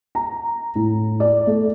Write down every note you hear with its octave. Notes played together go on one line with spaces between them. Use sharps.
A#5
A2
D5
A3